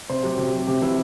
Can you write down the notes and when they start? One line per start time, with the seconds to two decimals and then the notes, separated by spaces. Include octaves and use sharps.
0.10 C3 C5
0.23 F#3 G4
0.38 C3 G4
0.53 F#3
0.67 C3 G4
0.82 E3 E4